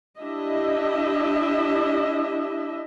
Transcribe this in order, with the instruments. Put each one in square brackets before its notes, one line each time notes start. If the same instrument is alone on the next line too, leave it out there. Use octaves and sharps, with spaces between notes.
[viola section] D4 E4 G4 D#5 E5